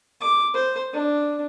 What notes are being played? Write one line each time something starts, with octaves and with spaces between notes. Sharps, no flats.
D6
C5
D4